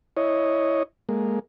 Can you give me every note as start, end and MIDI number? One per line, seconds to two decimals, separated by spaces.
0.17 0.83 64
0.17 0.83 73
0.17 0.83 75
1.09 1.39 56
1.09 1.39 58